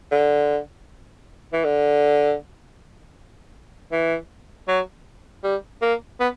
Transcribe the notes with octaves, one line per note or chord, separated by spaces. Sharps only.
D3
E3
D3
E3
F#3
G3
A#3
B3